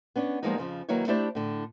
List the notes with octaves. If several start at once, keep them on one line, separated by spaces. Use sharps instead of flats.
B3 C#4 D4
F3 G3 G#3 A#3 B3 D#4
F2 C#3 F3
D#3 F#3 A#3 E4 B4 C#5
A3 D4 E4 G4 C5 D5
A2 D3